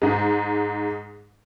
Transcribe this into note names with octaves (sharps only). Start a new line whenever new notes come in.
G#2 G#3